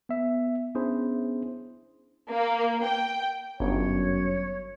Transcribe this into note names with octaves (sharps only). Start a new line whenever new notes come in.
B3 E5
B3 C#4 D4 E4 G#4 C5
A#3
G5
G1 F#2 C#5